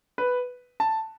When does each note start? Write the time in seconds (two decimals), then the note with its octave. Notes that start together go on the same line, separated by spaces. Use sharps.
0.18 B4
0.80 A5